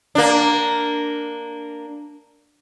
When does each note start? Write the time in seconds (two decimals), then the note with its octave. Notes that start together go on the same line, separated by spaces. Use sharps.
0.15 A#3 D4